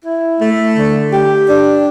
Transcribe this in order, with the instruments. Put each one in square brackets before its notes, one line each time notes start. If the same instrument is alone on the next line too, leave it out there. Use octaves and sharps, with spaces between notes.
[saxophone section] E4
A3
D3
G4
D4